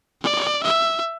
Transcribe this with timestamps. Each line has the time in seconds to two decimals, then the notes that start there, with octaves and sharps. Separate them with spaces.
0.21 D5
0.63 E5